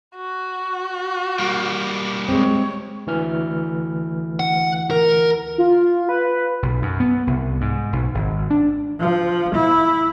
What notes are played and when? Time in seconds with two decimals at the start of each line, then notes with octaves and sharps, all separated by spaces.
0.17 F#4
1.39 G3 A#3
2.29 G#3 C4 C#5
3.07 D2 E3 F6
4.40 F#5
4.91 A#4
5.58 F4
6.09 B4
6.62 B1
6.82 F#2
7.00 B3
7.27 C2
7.61 G#2
7.93 B1
8.14 G#1
8.50 D4
9.00 F3
9.55 E4